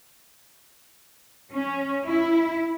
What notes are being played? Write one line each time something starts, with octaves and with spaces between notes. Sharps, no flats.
C#4
E4